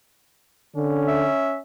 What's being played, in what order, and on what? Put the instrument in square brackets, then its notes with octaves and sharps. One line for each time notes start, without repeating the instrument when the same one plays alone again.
[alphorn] D3 [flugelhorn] C#4
[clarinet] E5